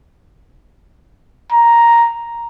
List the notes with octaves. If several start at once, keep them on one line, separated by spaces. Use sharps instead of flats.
A#5